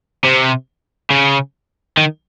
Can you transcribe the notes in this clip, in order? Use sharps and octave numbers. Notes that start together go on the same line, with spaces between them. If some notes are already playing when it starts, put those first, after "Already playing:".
C3
C#3
D#3